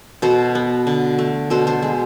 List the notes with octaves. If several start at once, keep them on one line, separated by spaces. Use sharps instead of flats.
B2 A4 C5
B3
D3
A3
B2 A4 C5
A4 C5
G#3